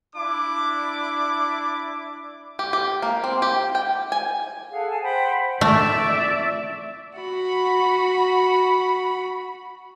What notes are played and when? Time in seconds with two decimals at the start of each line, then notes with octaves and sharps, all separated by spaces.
0.16 D4 E4 D6
2.59 G4
2.73 G4
3.02 A#3
3.24 C4
3.42 G4
3.75 G5
4.12 G#5
4.71 G#4 A4 F5 F#5
4.89 G#5 A5
5.02 C5 F#5 G5 B5
5.61 A3 D5 E5
7.19 F#4 B5